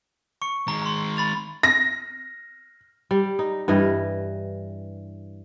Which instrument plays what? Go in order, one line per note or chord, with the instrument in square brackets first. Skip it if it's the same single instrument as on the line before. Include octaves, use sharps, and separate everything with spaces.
[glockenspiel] C#6 C#7
[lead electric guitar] D#3 G#3 [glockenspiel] A#5
[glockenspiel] A#5 C6
B5 A6 F7
[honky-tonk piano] A#6
[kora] G3
D#4
G2 E3 G3 D#5